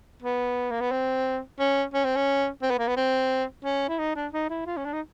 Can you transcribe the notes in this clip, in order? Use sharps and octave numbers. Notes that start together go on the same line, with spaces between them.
B3
A#3
B3
C4
C#4
C#4
C4
C#4
C4
B3
A#3
B3
C4
C#4
E4
D#4
D4
D#4
E4
F4
C#4
D4
D#4